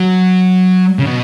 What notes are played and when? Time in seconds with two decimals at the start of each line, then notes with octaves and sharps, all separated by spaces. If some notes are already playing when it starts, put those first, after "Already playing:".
Already playing: F#3
0.99 C#3
1.06 B2